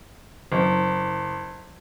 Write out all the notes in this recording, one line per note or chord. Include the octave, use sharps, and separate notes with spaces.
F#1